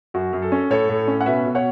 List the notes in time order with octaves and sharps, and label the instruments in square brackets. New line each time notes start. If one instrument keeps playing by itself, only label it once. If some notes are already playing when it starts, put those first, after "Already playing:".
[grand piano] F#2 F#4
F#2
A4
C#4
A2 A4 C#5
A2
C#4
F#5
B2 B4 E5
B2
C#5 F#5